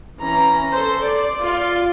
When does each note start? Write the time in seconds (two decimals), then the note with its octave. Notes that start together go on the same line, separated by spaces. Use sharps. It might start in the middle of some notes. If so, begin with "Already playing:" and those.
0.21 E3 C#4 A#5
0.72 A4 C5
1.02 D5
1.39 F4 D5